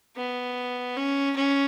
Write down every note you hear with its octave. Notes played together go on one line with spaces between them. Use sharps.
B3
C#4
C#4